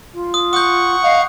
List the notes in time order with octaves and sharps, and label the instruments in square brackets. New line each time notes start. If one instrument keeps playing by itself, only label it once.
[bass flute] F4
[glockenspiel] D#6
[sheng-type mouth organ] F#5 C#6 [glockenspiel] D#6 G6
[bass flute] D#5 [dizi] F5